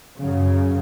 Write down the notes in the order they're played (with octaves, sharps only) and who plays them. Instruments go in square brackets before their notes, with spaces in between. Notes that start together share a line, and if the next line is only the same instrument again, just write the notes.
[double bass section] F#2 C#3